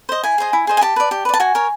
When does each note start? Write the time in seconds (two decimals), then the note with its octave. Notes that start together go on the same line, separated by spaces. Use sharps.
0.09 C5 D#5
0.24 E4 G#5
0.38 G#4 C5 D#5
0.53 E4
0.67 G#4 C5 D#5
0.77 G#5
0.81 G4 A5
0.96 B4 D5
1.11 G4
1.25 B4 D5
1.34 A5
1.40 F#4 G#5
1.55 A#4 C#5